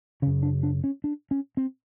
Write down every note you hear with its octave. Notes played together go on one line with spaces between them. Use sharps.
F#2 C#3 C#4
D4
D4
C#4
D4
C#4
C4